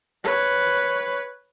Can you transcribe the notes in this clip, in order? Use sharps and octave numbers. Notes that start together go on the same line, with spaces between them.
B4 C#5